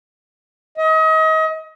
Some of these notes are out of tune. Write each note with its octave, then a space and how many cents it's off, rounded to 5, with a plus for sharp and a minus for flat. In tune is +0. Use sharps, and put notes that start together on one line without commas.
D#5 +35